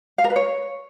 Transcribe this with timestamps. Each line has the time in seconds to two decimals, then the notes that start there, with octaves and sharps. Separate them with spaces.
0.18 F5
0.24 A#4
0.30 B4
0.36 C#5